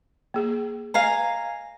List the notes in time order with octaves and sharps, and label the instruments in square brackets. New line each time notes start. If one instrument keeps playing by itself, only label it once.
[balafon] A#3 G#4
[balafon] B4 D#5 [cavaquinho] F5 G#5 A#5